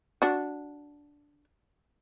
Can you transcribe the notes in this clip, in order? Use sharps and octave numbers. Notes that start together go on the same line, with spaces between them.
D4 F#4